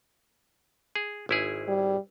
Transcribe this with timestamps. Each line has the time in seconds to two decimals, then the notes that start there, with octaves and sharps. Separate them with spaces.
0.95 G#4
1.29 G#1 E4 G#4
1.68 G3